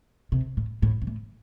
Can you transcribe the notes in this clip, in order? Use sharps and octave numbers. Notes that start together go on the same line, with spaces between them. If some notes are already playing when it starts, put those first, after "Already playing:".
C3
A2
A2
C3
A2